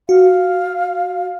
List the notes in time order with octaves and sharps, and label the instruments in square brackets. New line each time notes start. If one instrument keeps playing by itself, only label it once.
[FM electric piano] F#4 [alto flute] F5